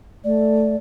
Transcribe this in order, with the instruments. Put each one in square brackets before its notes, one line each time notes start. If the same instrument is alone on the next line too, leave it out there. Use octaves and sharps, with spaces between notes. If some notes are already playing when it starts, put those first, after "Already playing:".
[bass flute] A3 [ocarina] D5